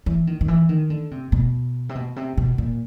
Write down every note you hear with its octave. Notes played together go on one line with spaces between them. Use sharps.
E3
D#3
D#3
E3
D#3
D3
C3
B2
C3
B2
C3
B2
A#2